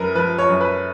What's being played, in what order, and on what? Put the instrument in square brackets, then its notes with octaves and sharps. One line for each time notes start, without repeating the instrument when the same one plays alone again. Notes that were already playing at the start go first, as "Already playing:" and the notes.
Already playing: [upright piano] F#2 A#4 B4
F3 B4
C#5
F#2
B4